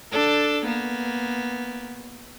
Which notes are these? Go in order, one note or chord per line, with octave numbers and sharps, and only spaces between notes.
D4 A4
A#3 B3